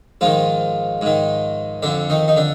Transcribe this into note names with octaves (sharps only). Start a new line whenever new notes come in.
G#2 D#3 F3 F4
G#2 D#3
F2 D3 D4
D#3 D#4
D#4
D3 D4